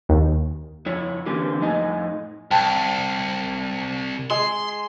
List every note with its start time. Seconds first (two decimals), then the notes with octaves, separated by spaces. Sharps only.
0.09 D#2
0.86 F2 E4 C#5
1.26 D3 E3 A#3 C4 C#4 G4
1.60 F2 A2 D#4 D#5 G#5
2.51 C2 G5 A5
4.30 G#3 C6